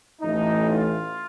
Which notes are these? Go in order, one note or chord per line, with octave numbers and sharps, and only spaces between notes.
A1 A2 E3 A3 D#4
F4